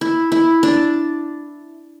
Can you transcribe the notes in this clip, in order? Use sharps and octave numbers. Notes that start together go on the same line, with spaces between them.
E4
E4
D4